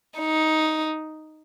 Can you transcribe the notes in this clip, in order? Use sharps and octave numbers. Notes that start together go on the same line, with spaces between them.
D#4